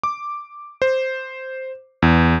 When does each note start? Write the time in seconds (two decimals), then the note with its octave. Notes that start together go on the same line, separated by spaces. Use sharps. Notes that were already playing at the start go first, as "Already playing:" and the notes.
0.03 D6
0.82 C5
2.02 E2